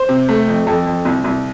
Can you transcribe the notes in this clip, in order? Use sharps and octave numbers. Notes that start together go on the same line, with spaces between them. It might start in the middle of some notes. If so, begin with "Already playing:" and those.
Already playing: C5
C3
A3
F2
F2 A4
F2
C2
C2